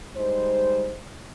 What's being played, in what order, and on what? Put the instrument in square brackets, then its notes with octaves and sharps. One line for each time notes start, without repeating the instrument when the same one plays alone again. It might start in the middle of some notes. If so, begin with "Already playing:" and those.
[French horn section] G3 G#3 D#4 C5